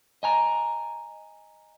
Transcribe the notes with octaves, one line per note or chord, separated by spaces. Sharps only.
D#5 G#5 A#5